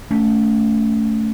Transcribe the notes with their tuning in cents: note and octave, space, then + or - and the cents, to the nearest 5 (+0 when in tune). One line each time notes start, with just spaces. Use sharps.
A3 +0 C#4 +25